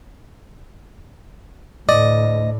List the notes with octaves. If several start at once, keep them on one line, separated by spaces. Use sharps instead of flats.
D2 A2 D5 D#5